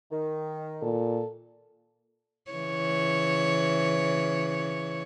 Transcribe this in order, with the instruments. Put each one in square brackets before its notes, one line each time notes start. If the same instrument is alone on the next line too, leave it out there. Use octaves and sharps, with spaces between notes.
[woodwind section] D#3
[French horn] A#2 [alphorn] A4
[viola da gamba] C#3 E3 C#5